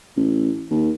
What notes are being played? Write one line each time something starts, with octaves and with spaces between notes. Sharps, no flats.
A1
D#2